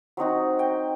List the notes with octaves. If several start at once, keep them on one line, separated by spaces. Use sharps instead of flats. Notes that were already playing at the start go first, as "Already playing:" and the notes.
F#3 C4 D#4 F#4
G5